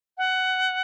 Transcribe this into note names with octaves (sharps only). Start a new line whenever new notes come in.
F#5